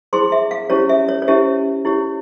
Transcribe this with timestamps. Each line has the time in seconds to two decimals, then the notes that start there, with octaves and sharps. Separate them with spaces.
0.13 E4 G#4 C5 C6
0.32 E5
0.51 F5
0.70 C#4 E4 G4 C5 C#5
0.89 E5
1.09 C#5
1.22 C#5
1.27 C#4 E4 G4 C5 E5
1.85 E4 G4 C#5